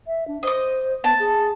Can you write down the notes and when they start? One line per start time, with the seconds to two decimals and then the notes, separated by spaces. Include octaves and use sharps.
0.08 E5
0.28 D4
0.43 C5 D#5 D#6
1.04 B3 A5
1.19 G#4